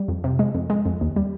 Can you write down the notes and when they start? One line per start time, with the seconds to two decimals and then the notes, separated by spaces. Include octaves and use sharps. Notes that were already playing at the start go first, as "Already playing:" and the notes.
Already playing: G3
0.08 F2
0.24 C3
0.39 G#3
0.55 F2
0.70 G#3
0.86 F2
1.01 D#2
1.16 G3